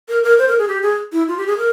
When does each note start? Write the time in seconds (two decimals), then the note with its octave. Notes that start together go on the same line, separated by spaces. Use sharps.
0.09 A#4
0.24 A#4
0.38 C5
0.48 A#4
0.59 G#4
0.68 G4
0.83 G#4
1.13 E4
1.28 F4
1.38 G4
1.47 G#4
1.57 A#4